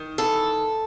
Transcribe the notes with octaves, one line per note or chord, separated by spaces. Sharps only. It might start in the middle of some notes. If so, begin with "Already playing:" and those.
Already playing: D#3
E3 A4